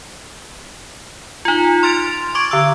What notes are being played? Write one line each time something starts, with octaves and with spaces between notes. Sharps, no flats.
D#4 F4
C6 F6 A6 D7 F7
C#6 D6 G#6 D7
D3 E6